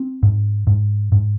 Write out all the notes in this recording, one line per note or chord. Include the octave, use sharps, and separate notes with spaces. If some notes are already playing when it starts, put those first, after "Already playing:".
Already playing: C4
G#2
G#2
G#2